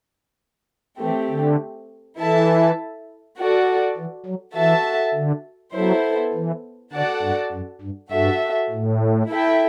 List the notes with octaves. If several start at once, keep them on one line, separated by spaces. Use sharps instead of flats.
E3 A3 C4 G4
D3
E3 E4 A4 E5 A5
F#4 A4 D5
E3
F#3
E3 F#4 A4 E5 A5
D3
F#3 B3 E4 A4 C5
E3
D3 F#4 A4 D5 F#5 A5
G2
F#2
G2
G2 F#4 A4 E5
A2
E4 A4 E5 G5